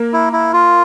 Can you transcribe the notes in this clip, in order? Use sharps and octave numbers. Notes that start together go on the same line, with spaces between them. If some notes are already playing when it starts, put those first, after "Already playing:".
Already playing: A#3 A#4
E4
E4
F4